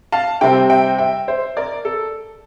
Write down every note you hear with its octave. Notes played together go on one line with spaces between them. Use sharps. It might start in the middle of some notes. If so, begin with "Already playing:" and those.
F5 A5
C3 G3 C4 E5 G5
E5 G5
E5 G5
C5 E5
A#4 D5
A4